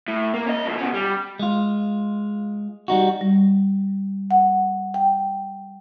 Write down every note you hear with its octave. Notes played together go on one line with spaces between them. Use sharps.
A2
A#3
C#4 D#5
A2 F3
B2 C#4
G3
G#3 F4
G3 D#4 F#4
G3
F#5
G5